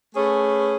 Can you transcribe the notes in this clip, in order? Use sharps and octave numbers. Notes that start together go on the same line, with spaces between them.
A3 C#4 G#4 B4